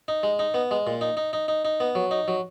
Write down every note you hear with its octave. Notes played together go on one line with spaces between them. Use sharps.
D#4
G#3
D#4
B3
G#3
A#2
D#4
D#4
D#4
D#4
D#4
B3
F#3
D#4
F#3